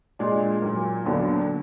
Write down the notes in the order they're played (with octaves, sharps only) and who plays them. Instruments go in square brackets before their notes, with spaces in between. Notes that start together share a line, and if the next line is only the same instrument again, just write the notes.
[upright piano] A#2 G#3 D4
A#2 F#3 A#3
D#2 D3 F#3 B3 D4